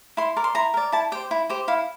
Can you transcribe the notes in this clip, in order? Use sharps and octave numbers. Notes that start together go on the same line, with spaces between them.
E4 C6
A#4 D5
C6
E4 A#5
A#4 D5
E4 A5
G4 C5 G5
E4
G4 C5
E4 F5